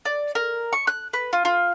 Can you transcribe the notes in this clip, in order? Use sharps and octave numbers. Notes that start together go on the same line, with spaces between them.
D5
A#4
C#6
F#6
B4
F4
F4